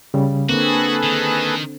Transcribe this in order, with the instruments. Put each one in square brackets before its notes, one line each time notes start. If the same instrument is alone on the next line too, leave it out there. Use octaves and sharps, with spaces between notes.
[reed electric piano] C#3 G3
[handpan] D3 C4 [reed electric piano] A#3 [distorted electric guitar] F#4 [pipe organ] G#4 A4 B4
[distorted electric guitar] D#3